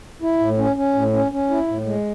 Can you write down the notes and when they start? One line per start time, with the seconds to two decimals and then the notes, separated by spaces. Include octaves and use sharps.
0.22 E4
0.40 A2
0.58 C#4
0.76 C#4
0.94 A2
1.13 C#4
1.32 C#4
1.50 E4
1.68 A2
1.85 G#3